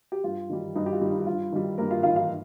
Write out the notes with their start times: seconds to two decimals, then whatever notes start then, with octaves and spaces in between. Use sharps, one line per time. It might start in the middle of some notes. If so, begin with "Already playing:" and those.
0.12 G4
0.24 G2 F4
0.50 D#3 G3
0.75 G2 D#4
0.86 G4
0.92 F4
1.01 D#3 G3
1.10 D#4
1.19 G4
1.26 G2 F4
1.52 D#3 G3
1.78 G2 A#3 A#4
1.91 F4 F5
2.03 D#3 G3 F4 F5
2.16 F4 F5